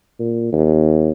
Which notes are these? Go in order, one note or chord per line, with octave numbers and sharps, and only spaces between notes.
A#2
D#2